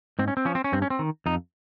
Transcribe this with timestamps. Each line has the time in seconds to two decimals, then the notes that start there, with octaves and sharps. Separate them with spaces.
0.19 G#2 C4
0.28 C#4
0.37 C4
0.45 F3 C#4
0.55 C4
0.64 C#4
0.73 G2 C4
0.82 C#4
0.90 C4
0.99 D#3
1.26 F2 D#4